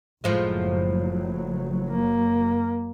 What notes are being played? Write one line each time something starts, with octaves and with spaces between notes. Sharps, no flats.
F#1 A2 F3 F#3 G#3
A#3